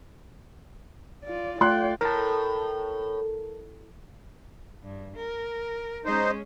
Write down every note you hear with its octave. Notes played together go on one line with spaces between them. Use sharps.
F4 D5
A3 F4 D5 G5 C6 F#6
A2 A#4 A5
G2
A#4
G#3 C#4 D#4 C5